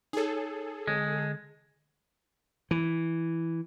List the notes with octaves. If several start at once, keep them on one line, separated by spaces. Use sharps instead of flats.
D#4 G#4 A4 C#5
D3 G#3
E3